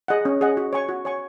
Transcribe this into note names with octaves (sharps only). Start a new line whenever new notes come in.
G#4 D#5 F#5
C#4
G#4 D#5 F#5
F#4
C#5 G#5 C#6
F#4
C#5 G#5 C#6